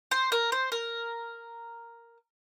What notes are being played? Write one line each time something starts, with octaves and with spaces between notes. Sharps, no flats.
C5
A#4
C5
A#4